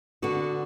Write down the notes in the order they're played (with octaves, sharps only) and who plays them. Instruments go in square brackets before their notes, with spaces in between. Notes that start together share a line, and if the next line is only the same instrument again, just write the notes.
[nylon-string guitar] D3 B3 F#4